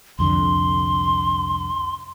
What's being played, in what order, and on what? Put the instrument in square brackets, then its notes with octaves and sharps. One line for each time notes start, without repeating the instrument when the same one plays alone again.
[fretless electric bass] C2 F2 D3 [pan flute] C6